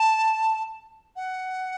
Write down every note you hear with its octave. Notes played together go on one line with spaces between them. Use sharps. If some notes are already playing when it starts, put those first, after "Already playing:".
Already playing: A5
F#5